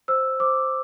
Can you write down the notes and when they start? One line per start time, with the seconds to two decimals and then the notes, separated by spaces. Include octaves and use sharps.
0.08 C5 E6
0.40 C5 D6